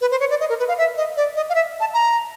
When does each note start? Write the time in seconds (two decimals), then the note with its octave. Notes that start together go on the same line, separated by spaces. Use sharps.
0.01 B4
0.11 C5
0.20 C#5
0.30 D5
0.40 D#5
0.49 A#4
0.59 B4
0.68 F5
0.78 E5
0.97 D#5
1.17 D5
1.36 D#5
1.50 F5
1.55 E5
1.80 A5
1.94 A#5